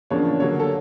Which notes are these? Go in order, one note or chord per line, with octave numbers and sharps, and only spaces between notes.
E2 C#3 F3 A#3 D4 C#5
D3 F#3 A#3 C#5
A4